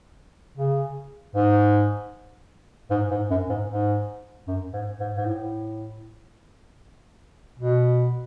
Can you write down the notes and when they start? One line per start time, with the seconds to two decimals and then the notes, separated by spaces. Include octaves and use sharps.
0.58 C#3
1.36 G#2
2.91 G#2
3.11 G#2
3.30 F#2
3.49 G#2
3.70 G#2
4.47 F#2
4.73 G#2
5.00 G#2
5.17 G#2
5.26 A2
7.59 B2